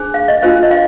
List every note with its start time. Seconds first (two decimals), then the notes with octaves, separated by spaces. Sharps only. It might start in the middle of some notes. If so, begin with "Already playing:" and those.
Already playing: D4 G#4 C5
0.14 F5
0.28 D#5
0.42 D4 F4 C5 F5
0.63 D#5
0.71 F5